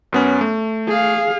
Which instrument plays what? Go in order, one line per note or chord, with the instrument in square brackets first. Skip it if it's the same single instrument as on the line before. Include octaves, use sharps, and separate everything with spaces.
[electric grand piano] F#2 B3 C#4
A3
[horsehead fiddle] G#4 F5